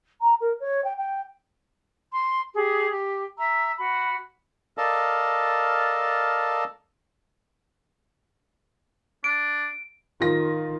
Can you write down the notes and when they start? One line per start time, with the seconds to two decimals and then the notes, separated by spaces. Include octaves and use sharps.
0.21 A#5
0.41 A#4
0.60 C#5
0.84 G5
0.97 G5
2.11 C6
2.55 G4 G#4
2.91 G4
3.39 E5 A#5 E6
3.79 F#4 B5
4.78 A4 A#4 D5 D#5 F5 A5
9.24 D4 D7
10.20 D#3 F4 A#6